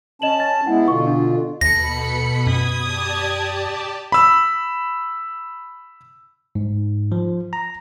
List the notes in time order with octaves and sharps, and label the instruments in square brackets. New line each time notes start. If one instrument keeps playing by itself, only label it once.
[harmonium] C#4 A5 [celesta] D#5 E7 F#7
[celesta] A6
[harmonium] G#3 B3 E4 [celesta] F#5
[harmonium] B2 D3 F4 [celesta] C#6
[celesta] D4
[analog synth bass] D#2 [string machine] B2 B5 [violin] A4 C#7 [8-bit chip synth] A#6
[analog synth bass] F#2 [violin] D#6 G#6
[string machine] G4 D5 A5
[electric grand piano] B5 E6
[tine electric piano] G#2
F3
A#5